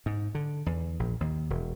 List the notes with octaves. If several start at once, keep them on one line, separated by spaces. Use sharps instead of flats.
G#2
D3
E2
A#1
D#2
E1